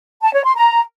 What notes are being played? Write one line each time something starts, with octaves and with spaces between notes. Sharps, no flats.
A5
C#5
C6
A#5